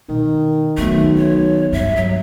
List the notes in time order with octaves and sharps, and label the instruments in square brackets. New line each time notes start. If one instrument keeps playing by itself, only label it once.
[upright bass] B2 [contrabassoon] D#3
[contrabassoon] B1 [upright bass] D#3 [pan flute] A3
[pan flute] C#5
[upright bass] G2 [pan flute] E5
[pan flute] F#3